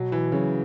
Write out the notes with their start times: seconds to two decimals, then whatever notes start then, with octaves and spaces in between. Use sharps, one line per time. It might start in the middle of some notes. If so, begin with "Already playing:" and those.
Already playing: B2 F#3
0.12 E3
0.32 C#3 F#3